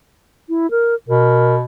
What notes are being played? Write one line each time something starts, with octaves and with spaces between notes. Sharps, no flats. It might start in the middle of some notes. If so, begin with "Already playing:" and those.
E4
A#4
B2 A#4